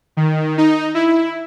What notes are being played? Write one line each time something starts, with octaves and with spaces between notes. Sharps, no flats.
D#3
D#4
E4